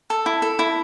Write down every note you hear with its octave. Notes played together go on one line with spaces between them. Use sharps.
A4
E4
A4
E4